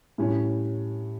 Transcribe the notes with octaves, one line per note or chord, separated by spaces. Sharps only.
A2 G3 C#4